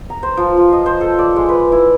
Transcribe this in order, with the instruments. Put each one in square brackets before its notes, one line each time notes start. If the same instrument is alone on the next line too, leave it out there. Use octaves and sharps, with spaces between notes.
[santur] A#5
C5
F3
F4
D#5
C5
A4
D5
G#3
B4
E4